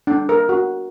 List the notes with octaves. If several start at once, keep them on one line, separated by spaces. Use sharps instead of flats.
D4
A#4
F#4